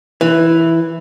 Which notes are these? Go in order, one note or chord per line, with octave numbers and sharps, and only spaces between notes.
E3